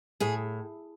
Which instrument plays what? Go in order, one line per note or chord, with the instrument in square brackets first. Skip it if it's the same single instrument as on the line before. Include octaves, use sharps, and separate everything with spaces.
[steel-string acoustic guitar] A2 G#4